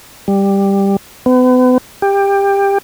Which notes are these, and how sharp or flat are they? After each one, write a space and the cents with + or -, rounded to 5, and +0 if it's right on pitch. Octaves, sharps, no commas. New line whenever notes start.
G3 +10
B3 +40
G4 +20